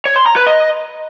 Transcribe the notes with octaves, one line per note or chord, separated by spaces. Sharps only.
C#5
C6
A#5
B4
D#5